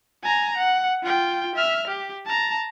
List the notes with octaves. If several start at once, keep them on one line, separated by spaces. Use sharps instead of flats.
G#5 A#5
F#5
F4 G5
E5 F6
G4
A5 A#5